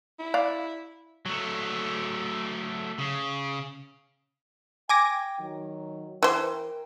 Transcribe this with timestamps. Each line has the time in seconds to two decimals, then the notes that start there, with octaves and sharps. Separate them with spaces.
0.19 E4
0.34 D5 F5
1.26 F#3 A3
2.98 C#3
4.89 G5 G#5 D6 A#6
5.39 D#3 F#3
6.23 E3 A#4 C5 G5